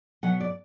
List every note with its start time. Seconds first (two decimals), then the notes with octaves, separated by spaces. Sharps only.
0.23 B2 F#3 B3 F#5
0.40 D5